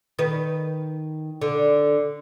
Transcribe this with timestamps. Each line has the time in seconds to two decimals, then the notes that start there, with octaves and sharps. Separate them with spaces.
0.19 D#3 B4
1.41 D3